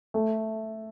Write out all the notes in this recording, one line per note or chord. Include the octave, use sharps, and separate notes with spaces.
A3